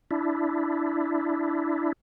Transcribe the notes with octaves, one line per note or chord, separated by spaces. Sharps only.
D4 E4